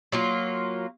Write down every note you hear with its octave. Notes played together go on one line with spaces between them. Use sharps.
F#3 A#3 F4